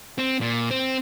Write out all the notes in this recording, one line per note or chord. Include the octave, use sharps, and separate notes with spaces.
C4
A#2
C4